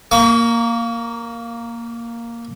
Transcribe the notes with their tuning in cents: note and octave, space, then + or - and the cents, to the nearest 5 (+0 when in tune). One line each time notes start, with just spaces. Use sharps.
A#3 +0 C#6 +40